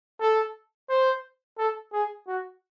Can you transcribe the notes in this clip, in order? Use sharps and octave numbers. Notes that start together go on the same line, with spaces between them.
A4
C5
A4
G#4
F#4